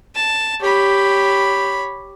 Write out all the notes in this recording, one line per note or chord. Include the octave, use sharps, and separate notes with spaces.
A5
G4 C#5 B5